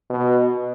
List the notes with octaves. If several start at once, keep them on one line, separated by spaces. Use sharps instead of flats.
B2